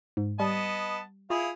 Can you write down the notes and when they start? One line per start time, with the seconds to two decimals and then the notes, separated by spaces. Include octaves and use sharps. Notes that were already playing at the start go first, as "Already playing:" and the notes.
0.17 G#2
0.40 G3 B3 D#5 A5
1.30 E4 F4 G#4 F5